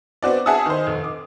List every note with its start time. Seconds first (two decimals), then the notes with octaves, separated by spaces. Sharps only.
0.22 B3 C4 F#4 D5
0.46 G#4 E5 F#5 G#5 A5 D#6
0.66 D#3 C5
0.86 F1
1.04 D6